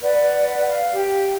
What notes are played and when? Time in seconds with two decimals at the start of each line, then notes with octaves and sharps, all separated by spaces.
0.02 B4 D5 F#5
0.68 F5
0.93 G4